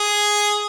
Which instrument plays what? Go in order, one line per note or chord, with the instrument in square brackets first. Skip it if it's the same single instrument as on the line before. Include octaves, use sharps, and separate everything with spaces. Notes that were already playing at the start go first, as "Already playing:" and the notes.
Already playing: [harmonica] G#4